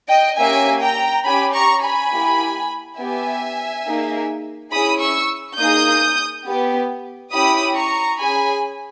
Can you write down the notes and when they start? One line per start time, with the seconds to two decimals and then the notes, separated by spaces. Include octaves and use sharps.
0.09 D#5 G5
0.38 A#3 C#4 G4 E5 G#5
0.81 G5 A#5
1.25 C#4 G4 G#5 B5
1.53 A#5 C#6
1.82 G#5 B5
2.12 A#3 E4 G4
2.99 B3 G4 E5 G#5
3.86 A#3 D#4 G#4
4.72 C#4 E4 G#4 B5 D#6
5.01 C#6 E6
5.58 A#3 D#4 G#4 D#6 G6
6.46 B3 G4
7.32 C#4 E4 G4 B5 D#6
7.76 A#5 C#6
8.19 C#4 G#4 G#5 B5